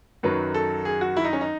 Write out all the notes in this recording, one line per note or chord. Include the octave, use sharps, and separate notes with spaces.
F#2 D#3 F#3 B4
A4
G#4
F#4
E4
D#4
C#4
D#4